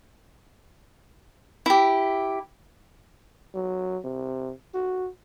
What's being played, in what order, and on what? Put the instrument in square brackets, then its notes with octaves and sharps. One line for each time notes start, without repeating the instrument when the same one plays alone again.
[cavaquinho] E4 G4
[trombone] F#3
C3
F#4